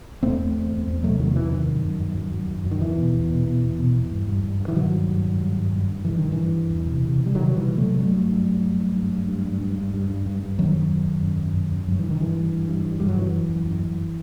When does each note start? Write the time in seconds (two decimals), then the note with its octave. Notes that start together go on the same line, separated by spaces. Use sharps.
0.23 E2 A3 C4
0.39 E2
0.55 E2
0.71 E2
0.87 E2
1.03 C3 F#3 A3
1.20 E2 D#3 F#3
1.35 C3 E3
1.52 F#2 D#3
1.68 F#2
1.85 F#2
2.01 F#2
2.17 F#2
2.33 F#2
2.50 F#2
2.66 F#2
2.71 D#3
2.81 E2 E3
2.98 B2
3.14 E2
3.30 B2
3.46 B2
3.63 E2
3.78 B2
3.95 E2
4.11 G2
4.27 G2
4.44 G2
4.60 G2
4.68 E3
4.76 G2 D#3 F#3
4.92 G2
5.08 G2
5.24 G2
5.41 G2
5.57 G2
5.73 G2
5.89 G2
6.05 G2 E3
6.18 G2 D#3
6.32 E3
6.38 G2
6.54 G2
6.70 E2
6.86 C3
7.02 C3
7.19 C3
7.26 G3
7.34 C3 D#3 F#3
7.51 C3
7.56 E3 G3
7.67 C3
7.77 F#3 A3
7.83 C3
7.99 G2 F#3 A3
8.15 G2
8.32 G2
8.48 G2
8.64 G2
8.80 G2
8.96 G2
9.13 G2
9.29 G2
9.45 G2
9.61 G2
9.78 G2
9.94 G2
10.10 G2
10.26 G2
10.42 G2
10.58 F#2 D#3 F#3
10.75 F#2
10.91 F#2
11.07 F#2
11.23 F#2
11.39 F#2
11.56 F#2
11.72 F#2
11.88 G2 F#3
11.99 E3
12.04 G2
12.10 D#3
12.20 G2 E3
12.36 G2
12.52 G2
12.69 G2
12.85 G2
13.00 G2 G3
13.09 F#3
13.17 F#2 E3
13.34 F#2
13.50 F#2
13.66 F#2
13.82 F#2